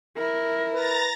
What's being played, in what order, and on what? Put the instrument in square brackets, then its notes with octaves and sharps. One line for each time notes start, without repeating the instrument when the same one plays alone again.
[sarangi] E4 [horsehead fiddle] A#4
[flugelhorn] B4 [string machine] A#5 A6 A#6